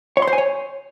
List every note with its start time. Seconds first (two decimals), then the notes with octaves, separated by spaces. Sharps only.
0.17 C#5
0.22 C6
0.28 C5
0.33 G#5
0.38 C#5